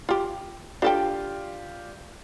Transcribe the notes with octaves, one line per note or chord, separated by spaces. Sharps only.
F4 G4
D4 F4 G4 A4 D5 G5